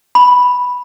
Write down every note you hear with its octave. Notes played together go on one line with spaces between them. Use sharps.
B5